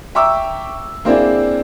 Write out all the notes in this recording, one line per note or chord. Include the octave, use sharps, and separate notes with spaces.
E5 G5 A#5 C#6 D6 E6
A#3 C4 D4 E4 G#4